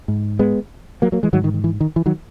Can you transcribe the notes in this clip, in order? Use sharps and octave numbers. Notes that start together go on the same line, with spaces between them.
G#2
G#3 B3
F#3 A#3
F#3 A#3
E3 G#3
G#2 D#3 F#3
D#3
D#3
E3
D#3
E3
D#3 F#3